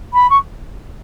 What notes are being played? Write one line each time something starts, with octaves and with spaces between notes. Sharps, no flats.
B5
C#6